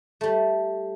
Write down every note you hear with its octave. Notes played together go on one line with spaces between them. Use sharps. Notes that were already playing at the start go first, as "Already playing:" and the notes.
G3 A3